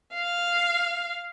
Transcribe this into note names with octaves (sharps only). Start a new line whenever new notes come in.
F5